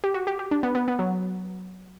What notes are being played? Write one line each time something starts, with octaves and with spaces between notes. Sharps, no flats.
G4
F#4
G4
G4
D4
B3
B3
B3
F#3